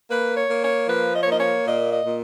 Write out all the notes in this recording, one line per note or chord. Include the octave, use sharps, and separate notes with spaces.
A#3 B4
C#5
A#3
C#5
F3 B4
D#5
C#5
A#3 D#5
C#5
A#2 D#5
D#5
A#2